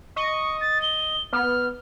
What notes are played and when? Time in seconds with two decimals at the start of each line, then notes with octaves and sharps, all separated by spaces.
0.16 D#5 C#6
0.61 A6
0.82 G7
1.33 B3 F6